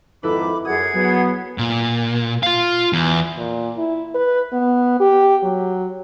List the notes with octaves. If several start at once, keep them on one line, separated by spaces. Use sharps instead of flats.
F2 G#2 D#3 E4 A4 B4 B5 D6
F#2 G#4 F#5 D#6 G#6
F#3 B3
A#2
F4 F5
E2
A#2
E4
B4
B3
G4
F#3